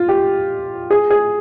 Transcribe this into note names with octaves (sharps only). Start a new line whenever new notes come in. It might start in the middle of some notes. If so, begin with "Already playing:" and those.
Already playing: F4
G4
G#4
G#4